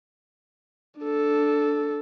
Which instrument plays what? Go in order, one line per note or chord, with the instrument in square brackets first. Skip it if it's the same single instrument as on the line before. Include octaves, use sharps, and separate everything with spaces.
[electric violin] D4 A4